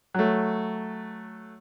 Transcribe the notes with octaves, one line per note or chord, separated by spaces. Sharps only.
F#3 A3